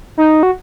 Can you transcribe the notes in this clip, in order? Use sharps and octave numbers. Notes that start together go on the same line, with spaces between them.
D#4
F#4